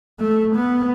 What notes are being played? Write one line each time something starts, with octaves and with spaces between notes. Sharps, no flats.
A3
B3